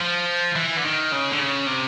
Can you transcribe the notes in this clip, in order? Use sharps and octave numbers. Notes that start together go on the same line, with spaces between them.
F3
E3
D3
D#3
C#3
D3
C#3
C3